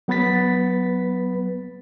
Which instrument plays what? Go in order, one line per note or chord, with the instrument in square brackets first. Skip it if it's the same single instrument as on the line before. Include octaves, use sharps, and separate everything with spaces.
[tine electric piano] F#3 B3 B4 B5 A6 B6